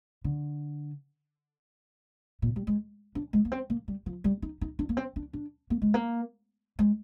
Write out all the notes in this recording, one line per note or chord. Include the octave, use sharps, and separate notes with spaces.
D3
A#2
G3
G#3
D4
G#3
A#3
C4
A#3
G3
F3
G3
D#4
D#4
D4
A#3
C4
D4
D4
A#3
G#3
A#3
G#3